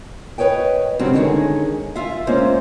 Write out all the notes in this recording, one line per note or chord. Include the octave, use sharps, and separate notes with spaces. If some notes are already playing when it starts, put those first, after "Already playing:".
B4 C#5 D#5 G5
G2 C#3 F#3 C4 F#4 G4
D3 D#3 G#3 C4 C#4
F4 E5 F5
G#3 A#3 C#4 F4 C5